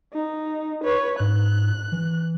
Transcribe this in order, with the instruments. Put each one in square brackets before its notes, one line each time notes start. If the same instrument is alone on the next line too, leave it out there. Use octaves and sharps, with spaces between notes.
[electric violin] D#4
B4 C#5
[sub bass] G#2 [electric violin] F#6
[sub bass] E3